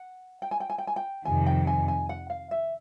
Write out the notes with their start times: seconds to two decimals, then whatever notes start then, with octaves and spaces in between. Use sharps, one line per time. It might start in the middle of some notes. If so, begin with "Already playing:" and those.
Already playing: F#5
0.42 G5
0.51 G#5
0.60 G5
0.70 G#5
0.78 G5
0.87 G#5
0.96 G5
1.25 F2 C3 D#3 G#5
1.46 G5
1.67 G#5
1.88 G#5
2.09 F#5
2.30 F5
2.51 E5